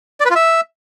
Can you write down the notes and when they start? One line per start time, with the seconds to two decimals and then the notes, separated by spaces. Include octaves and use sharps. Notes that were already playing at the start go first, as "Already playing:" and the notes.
0.20 D5
0.25 B4
0.30 F4
0.36 E5